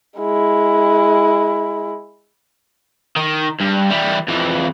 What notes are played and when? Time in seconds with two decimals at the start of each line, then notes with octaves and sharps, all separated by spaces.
0.18 G#3 E4
3.16 D#3
3.60 G2
3.90 E3 G3
4.28 F2 E3